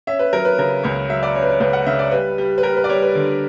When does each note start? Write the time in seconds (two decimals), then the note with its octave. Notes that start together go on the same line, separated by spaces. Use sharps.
0.07 C#4 E5
0.19 B4
0.33 F#3 A#4
0.45 B4
0.58 C#3 A#4
0.83 C#2 C#5
1.09 F#3 E5
1.23 D5
1.35 C#4 C#5
1.42 B4
1.49 C#5
1.60 C#2 B4
1.73 F#5
1.87 C#3 E5
1.99 D5
2.12 G3 B4
2.38 G3
2.58 B4
2.63 G3 A#4
2.77 B4
2.84 D5
2.89 G3 C#5
3.02 B4
3.15 D3